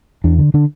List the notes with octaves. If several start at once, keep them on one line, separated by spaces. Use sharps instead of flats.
E2 D4
D3
D3 D4